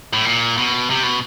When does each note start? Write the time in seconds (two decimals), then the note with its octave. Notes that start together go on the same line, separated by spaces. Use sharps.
0.13 A2
0.25 A#2
0.58 B2
0.90 C3
1.03 B2